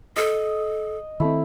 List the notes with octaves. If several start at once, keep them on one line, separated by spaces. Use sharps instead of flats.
A4 D#5
D#3 A3 C4 E4